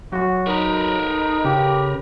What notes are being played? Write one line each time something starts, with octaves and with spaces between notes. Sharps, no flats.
F#3 F#4
D#4 A#4 B4
C#3 G4